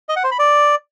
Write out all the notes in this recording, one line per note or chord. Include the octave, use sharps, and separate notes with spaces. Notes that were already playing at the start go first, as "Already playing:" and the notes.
D#5
F#5
C5
B5
D5